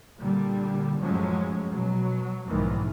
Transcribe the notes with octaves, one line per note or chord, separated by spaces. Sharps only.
A#2 D3 G3
F#2 A2 F3 F#3 G#3 C#4
B2 F#3
B1 F2 G#2 D#3 E3